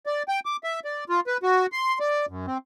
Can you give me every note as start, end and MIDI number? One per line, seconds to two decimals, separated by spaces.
0.06 0.23 74
0.28 0.40 79
0.46 0.57 86
0.64 0.80 76
0.85 1.04 74
1.09 1.20 65
1.27 1.37 71
1.43 1.66 66
1.72 1.99 84
2.00 2.26 74
2.29 2.46 42
2.47 2.58 60